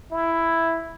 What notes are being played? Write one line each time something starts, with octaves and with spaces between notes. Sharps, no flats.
E4